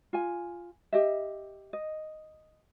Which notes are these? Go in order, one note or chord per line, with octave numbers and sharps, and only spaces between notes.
F4 G#5
G4 D#5 E5
D#5